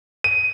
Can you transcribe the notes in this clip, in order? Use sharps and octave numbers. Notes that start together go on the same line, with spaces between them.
D#7